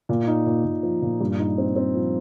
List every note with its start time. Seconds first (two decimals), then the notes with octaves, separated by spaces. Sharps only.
0.09 A#2
0.28 D#4
0.46 A#2
0.65 A#2
0.83 F3
1.02 A#2
1.21 G2
1.39 D#4
1.58 C4
1.76 C4
1.95 F3